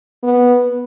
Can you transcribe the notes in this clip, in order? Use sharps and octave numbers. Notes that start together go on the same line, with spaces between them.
B3